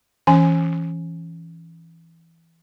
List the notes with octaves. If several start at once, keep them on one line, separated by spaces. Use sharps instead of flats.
E3 C#4 G#5